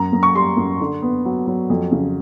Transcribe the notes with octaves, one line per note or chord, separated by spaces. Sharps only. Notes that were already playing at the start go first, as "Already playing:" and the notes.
Already playing: F#2 A#5
F#2
C#6
G3 C6
F#2
D3
B3
F#3
F#3
F2
C#3